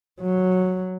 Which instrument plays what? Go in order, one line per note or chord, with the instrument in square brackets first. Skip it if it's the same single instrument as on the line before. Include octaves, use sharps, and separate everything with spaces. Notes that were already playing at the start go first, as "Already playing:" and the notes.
[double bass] F#3